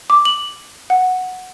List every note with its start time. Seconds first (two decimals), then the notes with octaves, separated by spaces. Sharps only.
0.10 D6
0.25 F#7
0.90 F#5